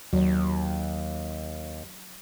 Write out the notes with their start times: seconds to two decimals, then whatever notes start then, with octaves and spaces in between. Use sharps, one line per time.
0.13 D#2 F#3